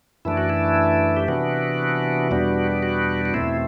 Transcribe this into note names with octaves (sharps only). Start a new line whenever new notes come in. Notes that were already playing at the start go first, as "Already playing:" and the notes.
F#2 E3 A3 D4 E4
F#4
E4
G4
C3 E3 B3 D4 F#4
E2 B2 G3 B3 D4
F#4
F#4
E2 B2 A3 C4 E4